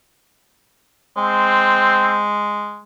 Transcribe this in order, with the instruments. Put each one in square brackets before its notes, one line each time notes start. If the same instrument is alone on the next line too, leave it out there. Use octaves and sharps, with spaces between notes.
[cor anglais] G#3 [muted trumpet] C4